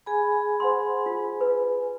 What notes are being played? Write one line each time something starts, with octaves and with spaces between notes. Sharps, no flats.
G#4 G#5 B5
C5 F#5 C6
F4
B4